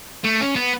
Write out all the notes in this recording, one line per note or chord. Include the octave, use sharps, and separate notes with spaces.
A3
C#4
B3